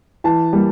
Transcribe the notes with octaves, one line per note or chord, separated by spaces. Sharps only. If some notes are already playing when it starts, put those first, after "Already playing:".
E3 A5
G3 A#3